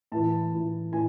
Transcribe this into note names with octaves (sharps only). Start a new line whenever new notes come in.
A2 E3 A5
A2 E3
A2 E3 G#5